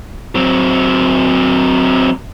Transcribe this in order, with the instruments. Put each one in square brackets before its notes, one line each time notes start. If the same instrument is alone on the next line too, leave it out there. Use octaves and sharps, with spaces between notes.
[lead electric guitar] F#3 C4